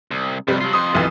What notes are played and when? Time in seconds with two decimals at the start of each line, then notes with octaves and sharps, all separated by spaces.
0.11 C2
0.48 F2 C3 G3
0.61 F#3 F4
0.73 F2 C6 D#6
0.93 F1 B1 E3